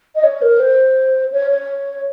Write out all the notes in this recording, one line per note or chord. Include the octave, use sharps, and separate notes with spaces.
D#5
C#5
A#4
C5
C#5
C#5